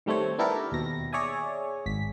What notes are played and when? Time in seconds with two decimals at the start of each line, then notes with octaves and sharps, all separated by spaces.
0.06 D#3 G3 A3 C4 C#5
0.38 B3 D4 E4 G4 A4 A#4
0.72 D#2 B2 A#6
1.13 G#4 C#5 D5 E5 G#5
1.86 G#1 B6